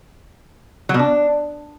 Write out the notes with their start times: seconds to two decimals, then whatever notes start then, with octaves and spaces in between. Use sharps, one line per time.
0.89 F#3
0.94 B2
0.99 D4